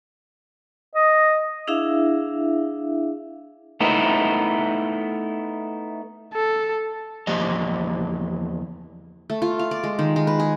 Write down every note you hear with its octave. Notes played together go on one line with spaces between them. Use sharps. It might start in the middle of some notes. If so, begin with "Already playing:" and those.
D#5
D4 E4 G#4 E5 F5
A3 B3 D#4 E4
A4
E2 F3 A#3 G4 D#5
A3
F4
F5
D5
G#3
D#3
G#3
B4
G#4